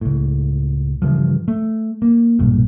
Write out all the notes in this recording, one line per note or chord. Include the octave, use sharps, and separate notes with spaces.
C#2 A2
G2 C#3 E3 F3
A3
A#3
B1 G2 A#2